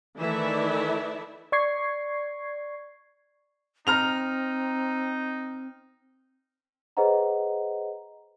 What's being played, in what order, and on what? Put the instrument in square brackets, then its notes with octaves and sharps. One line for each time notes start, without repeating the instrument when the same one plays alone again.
[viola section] D#3 E3 A3 E4 D5 E5
[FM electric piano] D5 C#6 G#6 C7
[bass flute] C4 [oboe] D#4 [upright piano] A#5 F6 F7
[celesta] G#4 B4 C5 D#5 F#5 A#5